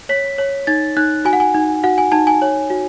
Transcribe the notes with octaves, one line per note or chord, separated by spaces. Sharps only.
C#5 B6
C#5
D#4 A6
D#4 F#6
F#4 G#5
F#5
G#5
D#4
F#4 F#5
G#5
D#4 A5
G#5
C#5
F#4